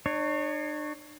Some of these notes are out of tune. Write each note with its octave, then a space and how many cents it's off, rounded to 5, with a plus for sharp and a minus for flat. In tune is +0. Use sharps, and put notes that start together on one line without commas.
D4 +45 C#5 +0